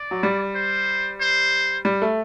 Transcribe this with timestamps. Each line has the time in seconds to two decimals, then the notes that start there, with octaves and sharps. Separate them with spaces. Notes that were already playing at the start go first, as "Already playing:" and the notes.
Already playing: D5
0.11 F#3
0.23 G3
0.55 C5
1.20 C5
1.85 G3
2.02 A3